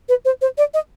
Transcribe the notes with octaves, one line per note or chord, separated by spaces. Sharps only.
B4
C5
C5
D5
D#5